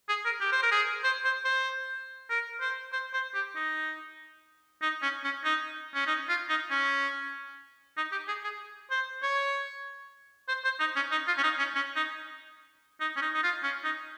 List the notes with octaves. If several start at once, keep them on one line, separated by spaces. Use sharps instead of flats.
G#4
A#4
G4
C5
A#4
G#4
C5
C5
C5
A#4
C5
C5
C5
G4
D#4
D#4
C#4
C#4
D#4
C#4
D#4
F4
D#4
C#4
D#4
G4
G#4
G#4
C5
C#5
C5
C5
D#4
C#4
D#4
F4
C#4
D#4
C#4
C#4
D#4
D#4
C#4
D#4
D#4
F4
C#4
D#4